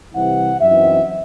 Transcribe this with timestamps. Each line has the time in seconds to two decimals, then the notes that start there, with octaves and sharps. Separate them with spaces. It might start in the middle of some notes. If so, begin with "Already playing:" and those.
0.14 C2 C3 E3 C4 E4 F#5
0.61 F#2 E3 C4 D#4 E5